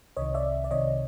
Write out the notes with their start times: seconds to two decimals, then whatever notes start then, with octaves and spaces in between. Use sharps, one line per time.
0.17 C2 C3 D#3 C#5 D#5
0.34 D5 E5
0.64 D5
0.70 C2 C3 D#3 C#5 D#5